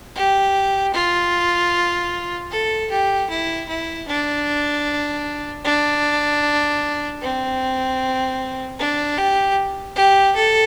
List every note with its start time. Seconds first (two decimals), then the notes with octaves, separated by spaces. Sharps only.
0.15 G4
0.93 F4
2.51 A4
2.90 G4
3.30 E4
3.68 E4
4.08 D4
5.64 D4
7.22 C4
8.79 D4
9.18 G4
9.96 G4
10.36 A4